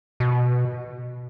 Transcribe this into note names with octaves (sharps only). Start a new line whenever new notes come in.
B2